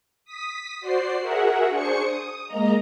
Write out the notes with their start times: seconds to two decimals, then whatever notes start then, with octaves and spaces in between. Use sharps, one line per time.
0.25 D#6 B6
0.81 F#4 C5 D5 C7
1.21 F#4 G#4 A#4 E5 F#5
1.70 D4 G#4 C5 C#6 C#7
2.01 D#6
2.46 G#3 A#3 D#5 A#5